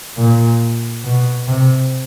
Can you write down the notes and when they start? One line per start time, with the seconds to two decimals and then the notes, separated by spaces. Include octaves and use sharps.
0.17 A#2
1.04 B2
1.48 C3